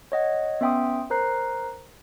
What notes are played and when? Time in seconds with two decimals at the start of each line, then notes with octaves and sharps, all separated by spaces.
0.12 C#5 D#5 F#5
0.61 B3 C#4 E5 G5 C6 D#6
1.10 A#4 C5 A#5 F#6 C7